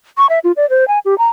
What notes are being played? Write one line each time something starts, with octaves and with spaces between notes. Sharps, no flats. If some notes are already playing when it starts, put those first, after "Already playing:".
C#6
E5
F4
D5
C5
G#5
G4
A#5